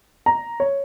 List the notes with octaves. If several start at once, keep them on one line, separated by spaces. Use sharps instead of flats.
A#5
C#5